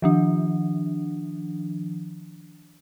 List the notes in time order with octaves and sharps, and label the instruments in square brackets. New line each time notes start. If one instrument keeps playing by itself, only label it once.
[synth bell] D#3 F3 D4